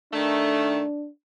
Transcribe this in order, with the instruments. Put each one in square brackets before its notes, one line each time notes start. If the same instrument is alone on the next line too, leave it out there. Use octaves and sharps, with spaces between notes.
[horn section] D#3 A3 [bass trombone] D4